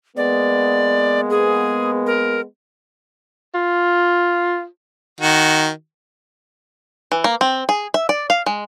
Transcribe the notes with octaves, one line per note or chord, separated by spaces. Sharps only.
G#3 A#3 B3 D5
G#4
A#4
F4
D#3 F#4
E3
A#3
C4
G#4
E5
D5
F5
G#3